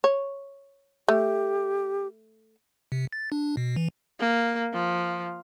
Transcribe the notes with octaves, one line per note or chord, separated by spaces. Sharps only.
C#5
A3 G4
C3
A6
D4
B2
E3
A#3
F3